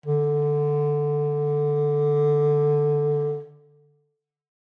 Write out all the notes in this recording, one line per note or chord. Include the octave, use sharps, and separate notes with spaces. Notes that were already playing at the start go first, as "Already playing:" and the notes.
D3